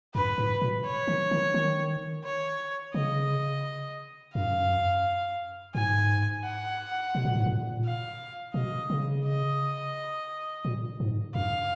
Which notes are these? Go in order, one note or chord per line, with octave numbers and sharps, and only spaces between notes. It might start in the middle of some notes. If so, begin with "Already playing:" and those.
F#2 B4
G#2
A#2
C#5
D#3
D#3
D#3
C#5
C#3 D#5
F#2 F5
G#2 G#5
F#5
B2
A#2
G#2
A#2
F5
B2 D#5
C#3
D#5
A#2
G#2
F#2 F5